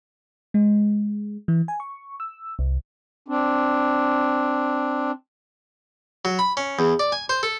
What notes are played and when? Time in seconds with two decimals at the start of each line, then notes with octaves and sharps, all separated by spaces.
0.54 G#3
1.48 E3
1.68 G#5
1.80 C#6
2.20 E6
2.59 C2
3.28 C4 D4
6.25 F#3
6.39 B5
6.57 C#4
6.79 E2
7.00 D5
7.12 G#5
7.29 C5
7.43 A4